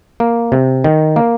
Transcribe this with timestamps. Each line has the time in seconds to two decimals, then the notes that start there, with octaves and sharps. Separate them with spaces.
0.20 A#3
0.52 C3
0.84 D#3
1.16 A#3